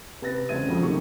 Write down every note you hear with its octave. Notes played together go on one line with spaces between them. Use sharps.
C3 B4 A6 A#6
E1 C#3 C4 E5 G#6 D#7
E1 A#1 F2 F3
D#1 C3 D#3 C#6